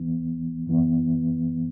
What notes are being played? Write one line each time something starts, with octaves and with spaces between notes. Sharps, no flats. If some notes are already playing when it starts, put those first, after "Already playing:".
Already playing: E2 E3 B3
F#2 E3 B3